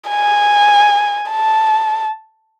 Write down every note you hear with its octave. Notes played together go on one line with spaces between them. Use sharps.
G#5
A5